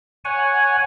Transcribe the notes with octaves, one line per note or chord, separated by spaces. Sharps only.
C#5 F#5 G#5